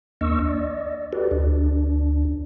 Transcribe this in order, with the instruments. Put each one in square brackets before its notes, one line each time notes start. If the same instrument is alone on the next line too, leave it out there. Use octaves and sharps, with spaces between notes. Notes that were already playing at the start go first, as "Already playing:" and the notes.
[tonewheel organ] D#2 A#3 D4 D#5 C#6 E6
D5 D#5
F#4 G4 A4 B4 D5
D2 D4